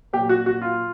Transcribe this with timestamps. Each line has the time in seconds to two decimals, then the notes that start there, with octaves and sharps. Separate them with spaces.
0.13 A#2 G4
0.17 F#3
0.29 F#4
0.46 F#4
0.62 F4